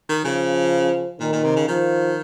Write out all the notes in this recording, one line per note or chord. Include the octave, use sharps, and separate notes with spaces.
D#3
C#3 F3
A#2 D#3
A#2
C3
C#3
D#3 F3